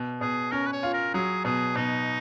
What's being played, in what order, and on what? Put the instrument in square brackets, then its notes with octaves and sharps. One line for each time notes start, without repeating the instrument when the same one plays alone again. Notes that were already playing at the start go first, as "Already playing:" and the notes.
Already playing: [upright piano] B2
[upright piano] B2 [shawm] G#4
[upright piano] C#4 [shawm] A#4
[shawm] B4
C#5
[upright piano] F4
[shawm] A#4
[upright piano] F#3 [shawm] G#4
[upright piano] B2 [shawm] G#4
[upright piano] B2 [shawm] D#4